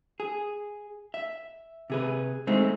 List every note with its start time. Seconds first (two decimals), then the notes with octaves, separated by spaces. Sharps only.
0.20 G#4
1.14 E5
1.90 C3 G#4 B4
2.47 G#3 A3 C4 D#4